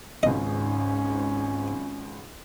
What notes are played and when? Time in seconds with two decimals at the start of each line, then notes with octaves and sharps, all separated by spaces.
0.23 G#1 C#2 G#2 C#4 D#5